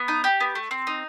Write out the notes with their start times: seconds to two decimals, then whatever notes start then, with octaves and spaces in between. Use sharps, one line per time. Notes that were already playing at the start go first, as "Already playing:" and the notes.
Already playing: B3
0.08 D#4
0.24 G4
0.40 B3
0.55 A3
0.71 C4
0.87 D#4